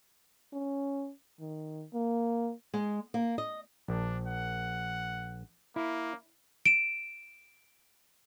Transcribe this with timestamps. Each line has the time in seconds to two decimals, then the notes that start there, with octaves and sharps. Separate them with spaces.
0.53 C#4
1.40 D#3
1.94 A#3
2.74 G#3
3.14 A#3
3.38 D#5
3.88 A#1 D4
4.28 F#5
5.76 A#3 E4
6.65 D7 E7